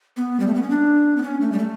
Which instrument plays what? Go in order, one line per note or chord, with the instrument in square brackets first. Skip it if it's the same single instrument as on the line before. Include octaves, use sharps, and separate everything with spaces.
[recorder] B3
G3
A3
B3
C#4
D4
B3
C#4
A3
G3
A3